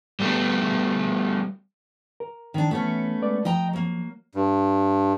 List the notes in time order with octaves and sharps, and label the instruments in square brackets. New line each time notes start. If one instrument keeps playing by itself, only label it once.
[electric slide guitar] G3 A3 B3
[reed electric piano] A#4
[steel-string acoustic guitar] D#3 D4
[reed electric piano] E3 [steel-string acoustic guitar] A3 B3 C#4
[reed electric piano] G#3 B4 D5
[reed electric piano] F3 [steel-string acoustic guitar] D#5 G5 A#5
[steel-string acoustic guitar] F#3 A#3
[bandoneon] G2